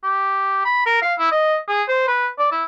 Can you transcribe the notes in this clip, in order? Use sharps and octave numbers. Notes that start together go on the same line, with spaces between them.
G4
B5
A#4
F5
E4
D#5
G#4
C5
B4
D5
E4